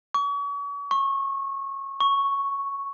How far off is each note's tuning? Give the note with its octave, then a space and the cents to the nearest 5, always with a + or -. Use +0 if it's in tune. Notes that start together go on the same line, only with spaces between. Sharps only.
C#6 +40
C#6 -25
C#6 +0